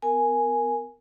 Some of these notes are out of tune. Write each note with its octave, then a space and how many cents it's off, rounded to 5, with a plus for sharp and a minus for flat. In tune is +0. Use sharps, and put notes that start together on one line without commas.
B3 +35 A#4 +0 G#5 +0